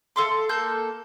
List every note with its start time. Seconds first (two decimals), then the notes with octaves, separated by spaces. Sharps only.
0.16 A4 F5 C6
0.49 A#3 A4 G6